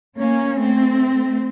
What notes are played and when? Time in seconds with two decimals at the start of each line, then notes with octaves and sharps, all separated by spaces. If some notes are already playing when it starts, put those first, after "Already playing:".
0.17 A#3 C#4
0.60 A3 C4